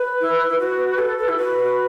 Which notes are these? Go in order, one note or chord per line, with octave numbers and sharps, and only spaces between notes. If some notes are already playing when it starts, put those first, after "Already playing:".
Already playing: B4
E4
E4
F#4 B4
A4
A4
E4
F#4 B4
F#4